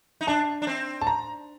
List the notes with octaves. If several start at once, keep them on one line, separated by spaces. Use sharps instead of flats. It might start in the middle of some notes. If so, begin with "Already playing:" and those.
D#4
D4 A5
D4
C4
A5
A#5